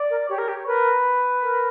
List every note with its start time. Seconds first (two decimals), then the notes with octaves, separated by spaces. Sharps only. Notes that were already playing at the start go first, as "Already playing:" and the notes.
Already playing: D5
0.10 A#4
0.29 G4 C#5
0.38 A#4
0.48 G4
0.66 A#4 B4
1.42 A#4